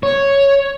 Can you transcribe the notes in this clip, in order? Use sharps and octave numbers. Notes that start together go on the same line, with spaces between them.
C#5